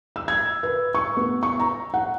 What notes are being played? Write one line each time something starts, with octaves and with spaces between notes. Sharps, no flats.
E6
G#6
B4
C#6
B3
C#6
A#5
F#5